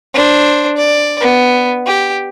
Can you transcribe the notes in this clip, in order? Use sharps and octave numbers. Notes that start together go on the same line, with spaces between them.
D4 C5
D5
B3
G4